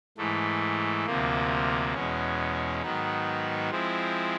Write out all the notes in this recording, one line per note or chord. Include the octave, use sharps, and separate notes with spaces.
G#2 E3 A3
D2 C3 F3 A#3
E2 B2 G#3 C#4
G#2 D#3 F#3 B3 D#4
F3 G#3 C4 E4